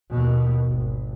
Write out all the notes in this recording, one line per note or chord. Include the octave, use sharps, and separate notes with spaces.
D#2 B2
G#1